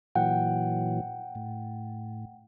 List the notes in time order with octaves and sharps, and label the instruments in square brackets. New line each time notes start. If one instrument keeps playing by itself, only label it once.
[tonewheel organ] A#2 E3 F#3 [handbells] F#5 G5
[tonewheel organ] A2